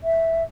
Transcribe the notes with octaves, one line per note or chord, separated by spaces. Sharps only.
E5